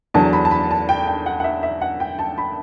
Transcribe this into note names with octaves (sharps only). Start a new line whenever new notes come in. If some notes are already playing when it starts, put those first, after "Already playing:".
E2 D3 F#3 A5
B5
A5
B5
A5
G5
G5
F#5
F#5
E5
E5
F#5
G5
A5
B5